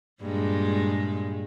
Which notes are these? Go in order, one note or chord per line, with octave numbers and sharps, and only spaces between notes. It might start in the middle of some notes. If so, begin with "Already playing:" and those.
G2 A#2 G#3